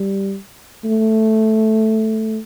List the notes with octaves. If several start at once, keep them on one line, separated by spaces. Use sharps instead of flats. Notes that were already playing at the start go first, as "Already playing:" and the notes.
Already playing: G3
A3